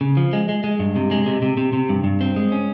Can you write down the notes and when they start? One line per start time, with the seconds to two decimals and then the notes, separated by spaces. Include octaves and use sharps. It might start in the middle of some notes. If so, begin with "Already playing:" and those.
0.01 C#3
0.17 F3
0.33 G#3
0.49 G#3
0.64 G#3
0.79 G2
0.96 C3
1.11 G#3
1.26 C3
1.42 C3
1.57 C3
1.73 C3
1.89 G2
2.04 G2
2.21 C4
2.36 G#3
2.52 C#4